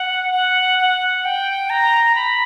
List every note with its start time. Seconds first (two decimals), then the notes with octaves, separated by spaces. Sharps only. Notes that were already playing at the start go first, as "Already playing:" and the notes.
Already playing: F#5
0.32 F#5
0.79 F#5
1.25 G5
1.70 A#5
2.15 B5